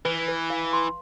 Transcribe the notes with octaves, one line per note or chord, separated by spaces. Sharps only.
E3 B4
B4
F5
C6